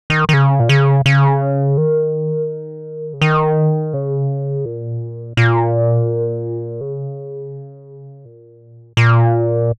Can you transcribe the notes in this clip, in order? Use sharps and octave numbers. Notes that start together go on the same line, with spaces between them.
D#3
D#3
C#3
A#2
C#3
C#3
D#3
C#3
D#3
C#3
A#2
A#2
C#3
A#2
A#2